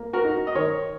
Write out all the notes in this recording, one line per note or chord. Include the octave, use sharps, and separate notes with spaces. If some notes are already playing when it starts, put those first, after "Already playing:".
Already playing: A#3
F#4 A#4
D#4
D#5
D#3 A#4 C#5